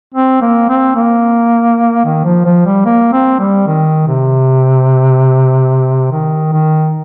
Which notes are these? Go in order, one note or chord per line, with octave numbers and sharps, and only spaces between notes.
C4
A#3
C4
A#3
D#3
F3
F3
G3
A#3
C4
G3
D#3
C3
D#3
D#3